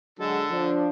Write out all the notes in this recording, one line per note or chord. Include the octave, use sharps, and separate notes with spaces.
D3 F#3 G#3 A4
F3 D4